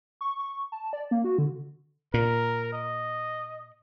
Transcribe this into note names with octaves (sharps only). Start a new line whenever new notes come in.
C#6
C#6
A5
D5
A#3
F#4
D3
A#2 A#4
D#5